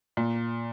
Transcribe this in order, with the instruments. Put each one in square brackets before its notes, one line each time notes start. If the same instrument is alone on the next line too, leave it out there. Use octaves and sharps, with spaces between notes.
[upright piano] A#2